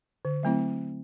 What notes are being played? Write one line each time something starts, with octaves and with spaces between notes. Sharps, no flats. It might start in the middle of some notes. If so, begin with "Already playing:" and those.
D3
F#3 A3 C4 E4